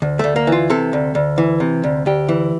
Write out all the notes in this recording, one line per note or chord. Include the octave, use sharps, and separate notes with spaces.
D2
D2 A3
A#3
E3 F4
C3 A4
D2
D2
E3
C3
D2
D2 G4
E3